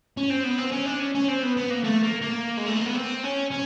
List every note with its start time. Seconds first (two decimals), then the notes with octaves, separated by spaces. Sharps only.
0.17 C#4
0.30 C4
0.44 B3
0.59 C4
0.73 C#4
0.86 D4
1.00 C#4
1.15 C#4
1.28 C4
1.43 B3
1.57 B3
1.70 A#3
1.84 A3
2.02 A#3
2.21 A#3
2.57 G#3
2.67 A3
2.76 A#3
2.86 B3
2.95 C4
3.23 C#4
3.51 C#4